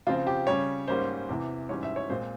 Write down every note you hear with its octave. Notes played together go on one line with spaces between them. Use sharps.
C#3 F3 C4 F4
G4
C#3 G3 C#4 C#5
G#2 G3 A#3 C#4 C5
E2 C3 E3
G#2 E3 G3 C#4 C#5
E5
C#5
A#2 G#3 C4 C5